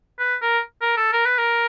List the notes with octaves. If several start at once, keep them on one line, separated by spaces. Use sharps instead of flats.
B4
A#4
A#4
A4
A#4
B4
A#4